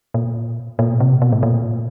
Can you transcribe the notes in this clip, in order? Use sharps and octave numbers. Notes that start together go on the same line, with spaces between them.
A#2
A#2
C3
B2
A2
A#2